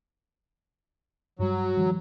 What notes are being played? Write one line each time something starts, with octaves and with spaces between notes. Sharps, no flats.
G2 F#3 G3
D#3 F3 G3